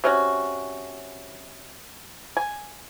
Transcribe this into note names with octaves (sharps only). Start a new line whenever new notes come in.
C3 C#4 F#4
G#5